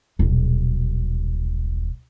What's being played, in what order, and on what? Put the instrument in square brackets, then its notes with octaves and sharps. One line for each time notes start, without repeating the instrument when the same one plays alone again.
[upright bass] D#1 B1